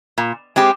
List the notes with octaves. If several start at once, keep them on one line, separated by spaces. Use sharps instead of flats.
A#2
G#3 C4 G4